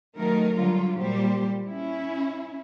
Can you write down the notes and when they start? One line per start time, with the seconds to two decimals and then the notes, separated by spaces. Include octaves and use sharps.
0.17 D#3 F#3 A3 D#4 A#4
0.58 D3 F#3 G3 F4
0.98 A#2 G3 G4 C5
1.70 C#4 E4